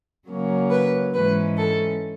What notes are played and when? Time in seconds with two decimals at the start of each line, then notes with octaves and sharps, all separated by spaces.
0.27 C#3 F#3 A#3 C#4
0.70 B4
1.13 G#2 E3 G#3 C#4 B4
1.57 A4